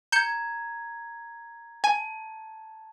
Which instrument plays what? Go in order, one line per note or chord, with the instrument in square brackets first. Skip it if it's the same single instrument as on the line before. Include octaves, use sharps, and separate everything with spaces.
[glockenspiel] A#5 G#6 [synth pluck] G6 C#7
[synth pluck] G#5 [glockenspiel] A5